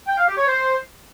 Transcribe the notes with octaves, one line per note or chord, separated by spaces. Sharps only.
G5
F5
G4
C#5
C5